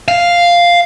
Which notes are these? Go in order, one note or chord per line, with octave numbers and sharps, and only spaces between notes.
F5